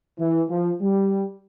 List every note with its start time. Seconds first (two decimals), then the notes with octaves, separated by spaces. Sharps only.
0.18 E3
0.49 F3
0.80 G3